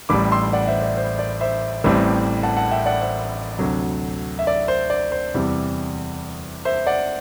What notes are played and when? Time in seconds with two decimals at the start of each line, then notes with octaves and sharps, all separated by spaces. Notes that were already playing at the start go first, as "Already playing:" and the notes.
0.09 A1 A2 G3 B5 D6
0.32 C6 E6
0.53 D5 F#5
0.67 C5 E5
0.82 D5
0.97 C5
1.19 D5
1.41 C5 E5
1.84 A1 A2 E3 G3 C4
2.43 F#5 A5
2.57 F#5 A5
2.71 E5 G5
2.86 D5 F#5
3.01 C5 E5
3.59 D2 C3 F#3
4.39 E5
4.47 D5
4.68 C5
4.90 D5
5.12 C5
5.34 E2 C3 E3 G3
6.65 C5 E5
6.87 D5 F#5